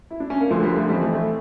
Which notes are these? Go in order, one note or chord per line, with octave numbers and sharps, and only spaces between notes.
E4
D4
C#4
A#3
D2 D3 F3 A3
G3
A3
F2 E3 G3
A3
A3